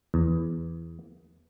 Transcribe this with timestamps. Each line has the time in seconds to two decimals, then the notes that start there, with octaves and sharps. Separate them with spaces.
0.14 E2